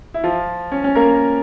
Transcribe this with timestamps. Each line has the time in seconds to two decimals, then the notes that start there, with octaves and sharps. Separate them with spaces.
0.14 E4
0.24 F3 F4
0.72 C#4
0.84 C#4
0.96 A#3 A#4